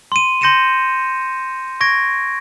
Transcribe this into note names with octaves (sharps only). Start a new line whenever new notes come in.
C6 D#7
C6 G6 A#6 C#7 D#7 E7
C#6 G#6 A#6 D7